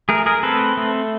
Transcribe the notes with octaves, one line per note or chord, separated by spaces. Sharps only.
A3 G#4 A#4
G#4 A#4
C4 A4 B4
A3